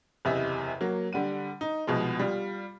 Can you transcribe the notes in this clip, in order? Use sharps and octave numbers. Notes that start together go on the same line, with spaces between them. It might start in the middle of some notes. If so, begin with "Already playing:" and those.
F#1 E2 C3 D#5 E5
F#3 A#3
D3 G3 F#5 D#7
D#4
C2 B2 F3 G#3
G3 F4